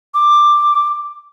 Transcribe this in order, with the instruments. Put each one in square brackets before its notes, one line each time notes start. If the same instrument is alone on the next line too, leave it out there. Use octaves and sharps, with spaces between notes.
[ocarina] D6